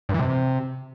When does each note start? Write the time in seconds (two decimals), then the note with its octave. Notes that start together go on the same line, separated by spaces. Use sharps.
0.09 G2
0.14 E3
0.19 C3